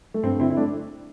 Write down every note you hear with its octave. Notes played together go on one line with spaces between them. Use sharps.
A3
G2 C4
D3 C4 E4
E4
A3 D4